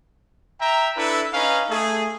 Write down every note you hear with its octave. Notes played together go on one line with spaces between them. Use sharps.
E5 G5 A#5
D4 E4 A4 B4
C#4 D#4 B4 F5
A3 G#4